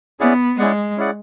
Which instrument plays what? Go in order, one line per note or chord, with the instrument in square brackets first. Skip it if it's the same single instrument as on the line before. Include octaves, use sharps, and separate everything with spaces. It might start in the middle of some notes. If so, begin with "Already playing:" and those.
[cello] B3 [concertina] C#4 E4 G#4 D5 F#5
[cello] G#3 [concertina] C#4 E4 G#4 D5 F#5
[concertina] C#4 E4 G#4 D5 F#5